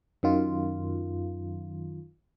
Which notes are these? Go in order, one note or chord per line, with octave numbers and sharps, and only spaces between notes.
F#2 D#3 F4